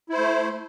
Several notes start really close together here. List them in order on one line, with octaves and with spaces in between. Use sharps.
E4 C5 A3